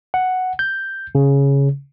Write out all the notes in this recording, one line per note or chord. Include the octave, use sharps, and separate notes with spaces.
F#5
G6
C#3